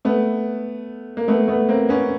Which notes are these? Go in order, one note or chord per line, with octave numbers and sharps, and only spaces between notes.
A3 B3
A#3
A3 B3
A3 B3
A#3 C4
B3 C#4